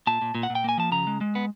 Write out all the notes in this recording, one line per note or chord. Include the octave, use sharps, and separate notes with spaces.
A#2 A5
A#2
A#2
F#5
A#2
G5
A#3 G#5
F3 A5
C#3 A#5
G#3
G#3
B3